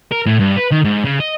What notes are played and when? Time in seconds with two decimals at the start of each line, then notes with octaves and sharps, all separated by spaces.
0.12 A#4
0.26 A2
0.39 G2
0.56 B4
0.71 D#3
0.84 G#2
1.04 C#3
1.20 D#5